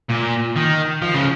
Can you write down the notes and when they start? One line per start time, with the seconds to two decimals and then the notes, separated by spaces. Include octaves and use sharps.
0.09 A#2
0.56 D#3
1.02 F3
1.14 C#3